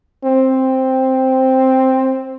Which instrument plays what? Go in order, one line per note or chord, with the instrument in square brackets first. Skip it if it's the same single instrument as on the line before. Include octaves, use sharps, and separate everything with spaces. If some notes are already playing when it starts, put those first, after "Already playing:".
[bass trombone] C4